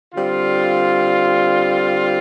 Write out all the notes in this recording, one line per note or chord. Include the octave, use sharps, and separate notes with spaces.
D3 G3 C4 F4